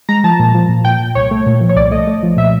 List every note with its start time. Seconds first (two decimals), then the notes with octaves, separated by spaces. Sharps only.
0.09 G#3 A#5
0.24 F3 A5
0.40 A#2
0.54 F3
0.69 A#2
0.84 A#2 G5
1.00 A#2
1.15 C2 C#5
1.31 A3
1.46 A#2
1.60 F3
1.69 C#5
1.76 C2 D5
1.91 A3 D#5
2.07 A3
2.23 F3
2.37 A#2 E5